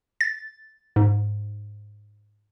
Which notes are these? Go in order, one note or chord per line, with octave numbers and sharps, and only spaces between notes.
A6
G#2